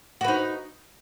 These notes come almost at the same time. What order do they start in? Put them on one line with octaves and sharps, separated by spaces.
F#4 B4 D#4